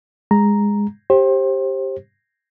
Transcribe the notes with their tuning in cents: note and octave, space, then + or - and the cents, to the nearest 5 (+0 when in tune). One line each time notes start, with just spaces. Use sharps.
G#3 -15 A#5 +0
G4 +0 C5 +30